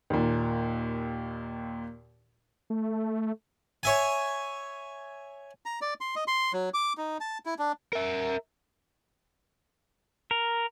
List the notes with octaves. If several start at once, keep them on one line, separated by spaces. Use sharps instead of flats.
D#2 A#2
A3
C#5 E5 G#5
A#5
D5
C6
D#5
C6
F#3
D6
D#4
A5
E4
D4
A#4 E5
A#4